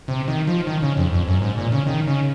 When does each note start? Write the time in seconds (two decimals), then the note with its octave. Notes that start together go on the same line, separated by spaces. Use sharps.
0.08 C3
0.28 D#3
0.47 F3
0.67 D#3
0.82 C#3
0.97 F2
1.13 F2
1.28 F#2
1.42 G#2
1.58 A#2
1.72 C#3
1.87 D#3
2.07 C#3